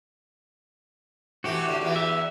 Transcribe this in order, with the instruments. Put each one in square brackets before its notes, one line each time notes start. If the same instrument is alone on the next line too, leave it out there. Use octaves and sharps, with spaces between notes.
[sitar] E3 A3 C4 [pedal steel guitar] F#4 G4
[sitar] A2 D3
E2 E3 B3
[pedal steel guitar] E5